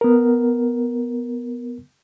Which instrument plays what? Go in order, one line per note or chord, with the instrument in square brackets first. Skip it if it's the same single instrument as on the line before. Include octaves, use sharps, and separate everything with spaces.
[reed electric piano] B3 A#4